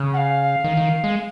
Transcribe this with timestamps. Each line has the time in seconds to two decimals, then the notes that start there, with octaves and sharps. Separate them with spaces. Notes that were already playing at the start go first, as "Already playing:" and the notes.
Already playing: C#3
0.13 F#5
0.17 F5
0.64 D#3
0.77 D#3
1.04 G#3